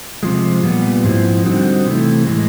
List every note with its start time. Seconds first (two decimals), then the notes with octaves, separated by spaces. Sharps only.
0.23 C3 F3 G#3
0.63 A#2 G3 B3
1.04 G#2 F3 G#3 C4 E4
1.45 D3 G3 C4 D#4 F#4
1.86 C3 E3 A3
2.27 A2 E3 G#3